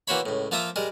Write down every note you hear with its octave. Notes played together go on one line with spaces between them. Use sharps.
E3 A#3 F#4 C5 C#5 B5
C#2 A2
F3 A#3 F4 E5 A#5 D#6
G3 G#3 A#4